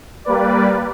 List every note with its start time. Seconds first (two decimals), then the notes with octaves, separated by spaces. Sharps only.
0.25 G3 A#3 B4 D5